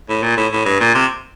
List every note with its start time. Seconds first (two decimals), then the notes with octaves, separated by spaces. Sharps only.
0.09 A2
0.22 A#2
0.37 A2
0.52 A2
0.65 G2
0.80 A#2
0.95 C3